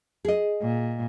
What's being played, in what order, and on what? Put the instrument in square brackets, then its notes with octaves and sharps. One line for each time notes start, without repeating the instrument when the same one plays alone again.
[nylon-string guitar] G#4 D#5
[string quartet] A#2